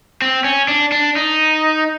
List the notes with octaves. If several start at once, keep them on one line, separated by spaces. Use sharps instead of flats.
C4
C#4
D4
D4
D#4